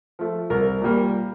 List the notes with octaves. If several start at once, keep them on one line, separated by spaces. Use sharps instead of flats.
F3 A3
C2 A#4
A#2 G3 A#3